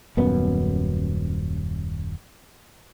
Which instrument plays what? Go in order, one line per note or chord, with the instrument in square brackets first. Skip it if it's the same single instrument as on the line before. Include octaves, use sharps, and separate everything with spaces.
[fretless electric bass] D#1 F#2 B3